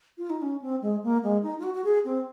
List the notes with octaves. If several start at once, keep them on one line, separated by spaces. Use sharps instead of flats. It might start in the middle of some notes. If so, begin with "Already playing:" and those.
F4
D#4
C#4
C4
G#3
A#3
G#3
D#4
F4
F#4
F#4
G#4
C4